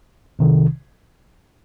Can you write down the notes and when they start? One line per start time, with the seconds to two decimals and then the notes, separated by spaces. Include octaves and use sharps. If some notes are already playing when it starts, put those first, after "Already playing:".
0.39 C2 C3 D#3